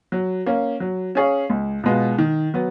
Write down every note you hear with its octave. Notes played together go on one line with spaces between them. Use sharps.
F#3
A#3 C#4
F#3
C#4 G#4 C#5 F5
C#2
B2 G#3 B3 F4
D#3
F#3 B3